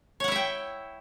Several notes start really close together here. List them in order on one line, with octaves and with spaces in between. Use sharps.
C#5 F#5 E4 E5 G5